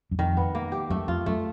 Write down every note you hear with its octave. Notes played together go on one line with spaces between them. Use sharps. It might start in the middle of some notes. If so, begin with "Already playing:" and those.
F#2
F2 D#3
B3
A#3
G4
F#2 A3
F2 F4
F#2 A3